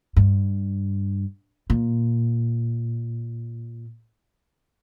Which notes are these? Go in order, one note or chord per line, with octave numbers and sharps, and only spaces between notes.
G2
A#2